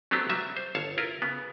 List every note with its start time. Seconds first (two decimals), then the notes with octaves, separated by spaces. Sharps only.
0.11 F#3 A3 B3 C4 D4 G4
0.29 F#3 G3 E5
0.57 C5
0.75 G1 C#5 F5 A5
0.98 E4 F4 A#4
1.22 C#3 B3